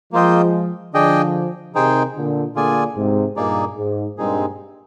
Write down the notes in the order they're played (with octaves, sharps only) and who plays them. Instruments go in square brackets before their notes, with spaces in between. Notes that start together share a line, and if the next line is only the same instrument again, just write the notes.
[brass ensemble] F3 G#3 [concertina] A#3 F4 C5 D#5 G5
[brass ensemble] D3 F3 [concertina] D4 G#4 D#5 G5
[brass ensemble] C3 D#3 [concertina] D#4 G#4 C5 G5
[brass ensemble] A#2 D3
[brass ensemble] A#2 D3 [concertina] F4 G#4 D5 G#5
[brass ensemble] G#2 C3
[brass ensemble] G2 A#2 [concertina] A#3 D#4 G#4 D5
[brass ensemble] G#2
[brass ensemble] G2 A#2 [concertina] G#3 C4 D#4 G#4